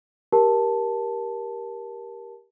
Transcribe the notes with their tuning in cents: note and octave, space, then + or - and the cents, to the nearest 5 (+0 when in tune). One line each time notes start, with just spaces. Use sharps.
G4 +0 A#4 +15 A5 +0